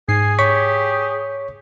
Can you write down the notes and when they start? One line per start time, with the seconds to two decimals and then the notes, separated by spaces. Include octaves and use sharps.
0.09 G#2 G#4 G#5 C7
0.39 G4 C#5 C#6 B6